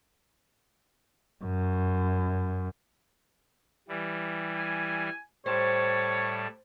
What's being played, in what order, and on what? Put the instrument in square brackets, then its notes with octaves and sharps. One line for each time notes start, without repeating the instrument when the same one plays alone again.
[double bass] F#2
[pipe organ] E3 G3
[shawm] G#5
[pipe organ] A2 G3 A5 [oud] C5 [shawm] C#5